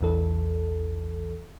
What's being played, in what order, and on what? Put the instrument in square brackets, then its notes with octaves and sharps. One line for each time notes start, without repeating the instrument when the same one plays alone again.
[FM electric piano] A#1 E2 E3 A4